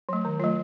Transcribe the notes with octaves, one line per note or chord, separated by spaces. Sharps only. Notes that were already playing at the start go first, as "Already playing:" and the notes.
F#3 A3
D#3
F#3 A3 F4